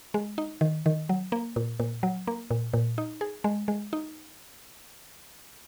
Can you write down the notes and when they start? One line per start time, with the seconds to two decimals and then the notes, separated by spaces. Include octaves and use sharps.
0.14 G#3
0.38 D#4
0.61 D#3
0.86 D#3
1.09 F#3
1.32 A#3
1.56 A#2
1.80 A#2
2.03 F#3
2.27 A#3
2.51 A#2
2.74 A#2
2.98 D#4
3.21 G#4
3.44 G#3
3.68 G#3
3.93 D#4